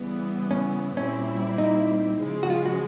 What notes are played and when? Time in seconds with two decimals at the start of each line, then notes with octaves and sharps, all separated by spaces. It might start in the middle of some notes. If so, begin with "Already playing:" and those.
Already playing: C#3 E3 G3 B3
0.51 C#4
0.96 A#2 G3 C4 C#4 E4
1.58 D#4
2.19 C#3 F3 G#3
2.43 F#4
2.50 F4
2.66 F#4